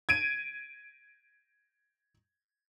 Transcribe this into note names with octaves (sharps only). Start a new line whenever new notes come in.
G#6 D7 D#7